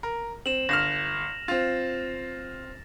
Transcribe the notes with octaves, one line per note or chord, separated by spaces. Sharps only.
A#4
C4 E7 F#7
G1 F6 A#6 E7 F7
C4 F4 A6